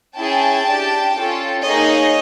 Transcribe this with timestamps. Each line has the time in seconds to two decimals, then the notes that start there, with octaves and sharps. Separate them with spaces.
0.17 C#4 E4 G#4 G5 A5
0.66 D4 G4
1.15 C#4 F4 A4
1.63 A#3 D#4 G#4 C#5 D#5